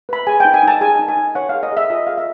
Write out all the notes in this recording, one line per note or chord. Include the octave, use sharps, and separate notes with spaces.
B4 B5
G#4 G#5
G5
D#4
G#5
D#4 A5
G#4 G#5
D#4
G#5
D#4
C#5 F#5
F5
G#4
D#5
G#4 E5
F4 D#5
G#4 F5
E5